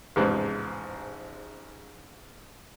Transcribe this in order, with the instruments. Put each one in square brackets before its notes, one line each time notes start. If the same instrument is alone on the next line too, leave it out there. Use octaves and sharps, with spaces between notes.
[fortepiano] A1 E2 G#2 C3 F3 F#6